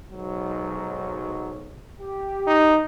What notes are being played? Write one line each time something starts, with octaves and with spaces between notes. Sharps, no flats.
B1 G#2 F#3
G4
D#4